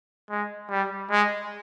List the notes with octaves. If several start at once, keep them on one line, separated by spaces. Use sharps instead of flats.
G#3
G3
G#3